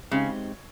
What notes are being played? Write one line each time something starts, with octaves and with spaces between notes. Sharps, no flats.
C#3 G#3 C4 D#4 G4